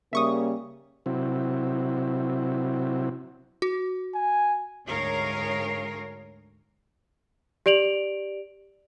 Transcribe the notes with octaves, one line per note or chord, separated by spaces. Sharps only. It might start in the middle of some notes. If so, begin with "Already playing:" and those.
C#3 G3 A#3 E5 C#6 D#6
C3 F#3 C4 E4
F#4
G#5
D2 G#2 G#4 A#4 C#5 F5
G4 D5 D7 F7 F#7